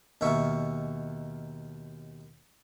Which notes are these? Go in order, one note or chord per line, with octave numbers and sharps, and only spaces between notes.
D#2 B2 D#3 E5 C#6